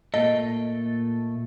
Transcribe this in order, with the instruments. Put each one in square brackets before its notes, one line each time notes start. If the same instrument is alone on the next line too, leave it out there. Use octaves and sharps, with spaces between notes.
[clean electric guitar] A#2 A3 A4 [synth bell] D#5